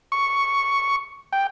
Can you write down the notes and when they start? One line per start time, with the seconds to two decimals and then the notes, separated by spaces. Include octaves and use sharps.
0.12 C#6
1.33 G5